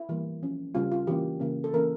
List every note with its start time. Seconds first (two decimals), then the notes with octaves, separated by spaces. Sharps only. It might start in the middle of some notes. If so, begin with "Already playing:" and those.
Already playing: E4
0.09 E3 G3 A#3
0.42 F3 C#4
0.75 C#3 G3 C#4 F4
0.92 F4
1.07 E3 A#3 C#4 G4
1.40 C#3 E3 A#3 C#4
1.64 A4
1.73 E3 A#3 C#4 A#4